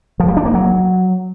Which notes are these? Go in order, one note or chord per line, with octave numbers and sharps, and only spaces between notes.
F3
G3
D4
A#3
F#3